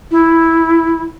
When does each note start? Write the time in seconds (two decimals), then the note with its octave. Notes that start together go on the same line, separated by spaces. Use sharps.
0.11 E4